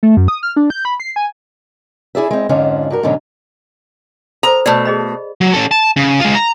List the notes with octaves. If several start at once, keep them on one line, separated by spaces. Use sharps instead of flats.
A3
F#2
D#6
F6
D4
G6
B5
C7
G#5
E4 G#4 D5 E5
G#3 C4
F2 G#2 D3 F3 C#4 D4
G2 F#4 A#4
G#2 B2 D3 F#3 C#4
A4 A#4 C5 A#5
B2 A3 D5 B5
G#4 D#5 B5
F#3
C#4 A4
A5
C#3
G#3 F4
A#5